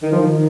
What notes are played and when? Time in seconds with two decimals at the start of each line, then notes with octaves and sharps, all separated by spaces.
0.02 D#3
0.12 F3
0.23 D#3